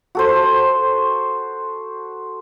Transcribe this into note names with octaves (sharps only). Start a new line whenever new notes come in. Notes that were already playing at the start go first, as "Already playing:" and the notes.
F#4 A4 C5